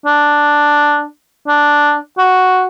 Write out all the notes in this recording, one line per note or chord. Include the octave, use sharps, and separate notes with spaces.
D4
D4
F#4